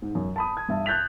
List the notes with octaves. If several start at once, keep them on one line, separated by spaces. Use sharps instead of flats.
G#2
F#2
A5 B5 D#6
G#6
G2 E5 A5
F#6 G6 A6 B6 F7